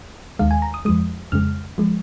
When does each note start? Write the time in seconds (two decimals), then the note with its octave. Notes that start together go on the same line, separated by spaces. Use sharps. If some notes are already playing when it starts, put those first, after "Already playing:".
0.39 D#2 D#3 G#3 F5
0.51 G#5
0.62 A#5
0.74 D#6
0.85 F2 F3 G#3 D#6
1.32 F2 C#3 G#3 F6
1.78 F3 G#3